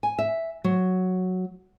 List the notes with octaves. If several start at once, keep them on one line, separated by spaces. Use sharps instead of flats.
G#5
E5
F#3